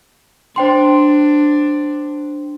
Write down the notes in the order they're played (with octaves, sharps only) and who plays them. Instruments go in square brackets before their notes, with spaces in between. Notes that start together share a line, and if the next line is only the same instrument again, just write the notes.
[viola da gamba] D4 [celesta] C5 G5 C6